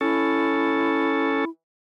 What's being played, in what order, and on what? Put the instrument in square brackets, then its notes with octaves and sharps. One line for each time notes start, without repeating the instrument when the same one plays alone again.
[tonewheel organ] C#4 A4 [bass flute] E4